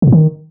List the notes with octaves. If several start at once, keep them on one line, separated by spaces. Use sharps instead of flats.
C#3
A2
D#3